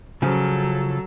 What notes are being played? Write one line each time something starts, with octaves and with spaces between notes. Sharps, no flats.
C#3 F3 F#3 A4